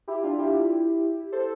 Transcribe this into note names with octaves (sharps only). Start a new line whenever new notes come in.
E4 G4
D4 F4
E4 G4
A4 C5